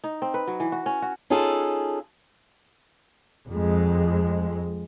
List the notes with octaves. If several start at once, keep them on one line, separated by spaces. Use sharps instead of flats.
D#4
C4
B4
F#3
E3
F#4
C#4
F#4
C#4 D#4 F4 G#4 A4
F2 G#3